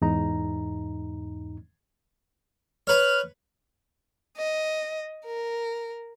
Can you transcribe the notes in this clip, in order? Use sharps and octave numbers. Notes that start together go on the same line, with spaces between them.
E2 G#2 D#4 A#5
B4 C#5 F6
D#5
A#4